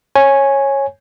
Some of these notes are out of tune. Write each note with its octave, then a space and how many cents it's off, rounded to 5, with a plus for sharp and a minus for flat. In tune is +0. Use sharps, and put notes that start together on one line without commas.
C#5 -15 G#5 +0